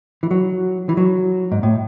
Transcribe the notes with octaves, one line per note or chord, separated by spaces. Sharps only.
E3
F#3
E3
F#3
G#2
A2